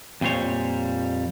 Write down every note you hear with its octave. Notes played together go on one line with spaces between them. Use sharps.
F2 A#2 G3 C5 C#5